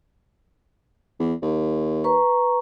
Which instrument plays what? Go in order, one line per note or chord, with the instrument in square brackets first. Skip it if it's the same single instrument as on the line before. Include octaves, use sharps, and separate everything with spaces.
[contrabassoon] E2
D#2
[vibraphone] B4 A#5 C#6